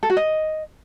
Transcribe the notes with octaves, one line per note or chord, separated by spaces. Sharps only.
A4
F#4
D#5